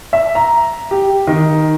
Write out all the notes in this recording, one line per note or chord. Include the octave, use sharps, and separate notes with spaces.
E5
A#5
G4
D#3